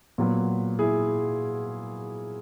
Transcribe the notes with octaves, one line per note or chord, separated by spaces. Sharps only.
A#2 F#3 B3
E4 G#4